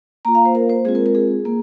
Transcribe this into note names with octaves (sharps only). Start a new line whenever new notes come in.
A#3 F4 A#5
F5
C5
A#4
C5
G#3 C4 F4 G#4
A#4
A#4
G#4
A#3